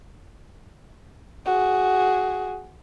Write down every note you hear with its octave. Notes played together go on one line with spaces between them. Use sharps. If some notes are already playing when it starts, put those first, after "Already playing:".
F#4 G#4